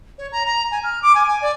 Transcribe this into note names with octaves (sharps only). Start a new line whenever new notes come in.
C#5
A#5
A#5
G#5
F6
D6
G#5
G#5
D5